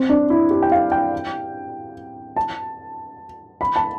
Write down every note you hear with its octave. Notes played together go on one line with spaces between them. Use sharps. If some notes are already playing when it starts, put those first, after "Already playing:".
Already playing: C4
D4
E4
G4
G5
F5
G5
A5
B5
A5